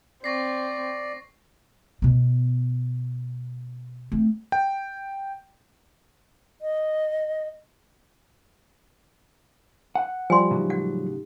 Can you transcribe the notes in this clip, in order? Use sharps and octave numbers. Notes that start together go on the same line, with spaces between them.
C4 D5 C#6 A#6 C7
B2 B3
A3 C4
G5
D#5
F#5
F3 G3 G4 G#5 C6
A2 C#3 F#3 D#4 G4
F#5